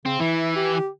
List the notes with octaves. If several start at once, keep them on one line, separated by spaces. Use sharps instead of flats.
C#3 C4
E3 E4
G4